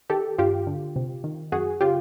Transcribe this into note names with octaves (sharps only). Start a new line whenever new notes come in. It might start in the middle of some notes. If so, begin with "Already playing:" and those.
D#3 G4 A4
G2 F4 G4
D3
C3
D#3
F#2 F#4 G#4
C#3 F4 G4